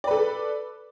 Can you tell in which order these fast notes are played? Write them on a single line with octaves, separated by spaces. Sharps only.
D5 B4 A4